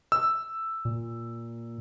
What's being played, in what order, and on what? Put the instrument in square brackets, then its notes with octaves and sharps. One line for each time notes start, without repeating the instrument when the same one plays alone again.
[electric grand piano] E6
[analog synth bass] A#2